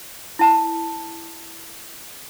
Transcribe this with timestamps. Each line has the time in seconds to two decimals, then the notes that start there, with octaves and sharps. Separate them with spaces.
0.39 E4 A5